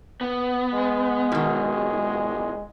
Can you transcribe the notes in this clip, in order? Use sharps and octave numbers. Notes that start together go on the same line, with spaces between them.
B3
G#3
B1 G#2 B2 D#3